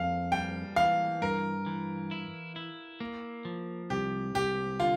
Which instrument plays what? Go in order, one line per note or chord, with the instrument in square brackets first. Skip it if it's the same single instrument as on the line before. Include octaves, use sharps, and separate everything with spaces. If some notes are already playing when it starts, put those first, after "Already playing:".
Already playing: [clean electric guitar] F2 [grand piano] F5
[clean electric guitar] G3 [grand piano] G5
[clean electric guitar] E3 [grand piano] F5
[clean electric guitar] G2 [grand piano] A#4
[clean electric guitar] E3
E4
E4
A#3
F3
[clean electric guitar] C2 [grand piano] G4
[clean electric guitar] C2 [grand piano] G4
[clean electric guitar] D3 [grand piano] F4